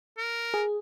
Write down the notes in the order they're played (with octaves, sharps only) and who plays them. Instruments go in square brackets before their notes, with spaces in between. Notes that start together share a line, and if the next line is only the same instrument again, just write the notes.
[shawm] A#4
[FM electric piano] G#4